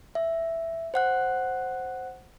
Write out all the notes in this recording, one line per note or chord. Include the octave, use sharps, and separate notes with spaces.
E5
C5 F#5 F#6